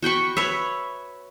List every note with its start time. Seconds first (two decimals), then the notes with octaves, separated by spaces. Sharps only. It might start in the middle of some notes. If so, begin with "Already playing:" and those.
0.02 F#4 G5 B5 C#6
0.37 B4 C#5 E5